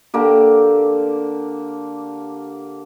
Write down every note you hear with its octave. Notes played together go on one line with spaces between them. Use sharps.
D3 A#3 G4